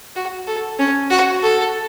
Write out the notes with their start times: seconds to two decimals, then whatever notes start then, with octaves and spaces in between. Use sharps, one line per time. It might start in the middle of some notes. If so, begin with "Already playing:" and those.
0.16 F#4
0.47 A4
0.79 C#4
1.10 F#4
1.43 A4